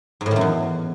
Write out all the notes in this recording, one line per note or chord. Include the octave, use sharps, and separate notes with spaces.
G#2
A2
D#3
F#2
E2